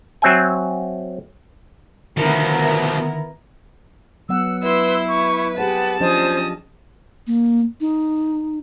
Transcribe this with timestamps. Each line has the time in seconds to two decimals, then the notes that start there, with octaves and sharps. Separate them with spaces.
0.22 F#3 C4 E5 G5 G#5
2.17 B2 D3 D#3 F3 B3 E4 A#4 C#7
4.29 F#3 B3 F#5 E6
4.63 E4 B4 C6 E6
5.09 B4 C#6
5.58 G4 G#4 C5 F#5 A5
6.01 F3 C#4 D4 C5 D#5 D#6
7.27 A#3
7.80 D#4